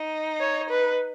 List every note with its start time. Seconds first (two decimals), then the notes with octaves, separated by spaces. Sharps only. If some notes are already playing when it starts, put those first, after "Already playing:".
Already playing: D#4
0.40 C#5
0.70 B4